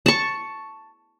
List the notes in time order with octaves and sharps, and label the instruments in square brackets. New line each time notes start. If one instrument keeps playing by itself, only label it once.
[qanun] A5 C#6